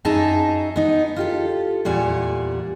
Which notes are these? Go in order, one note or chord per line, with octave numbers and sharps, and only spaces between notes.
F#2 D#4 G#4 E5 A5 A#5
B3 D#4
F4 G4 A4
E2 A#2 G3 F#5 G#5